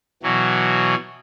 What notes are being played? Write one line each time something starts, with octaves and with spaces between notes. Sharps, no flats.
B2 E3 F#3